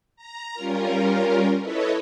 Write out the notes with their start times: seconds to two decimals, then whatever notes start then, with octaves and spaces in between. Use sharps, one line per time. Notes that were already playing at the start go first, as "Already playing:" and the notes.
0.16 A#5
0.54 G3 C#4 F4 A#4
1.60 E4 A4 B4 C#5 D#5